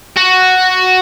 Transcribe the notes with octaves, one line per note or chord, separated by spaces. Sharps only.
F#4